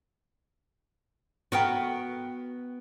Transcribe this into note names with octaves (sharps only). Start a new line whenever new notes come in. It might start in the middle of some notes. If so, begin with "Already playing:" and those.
B3 F#4 A#4 G5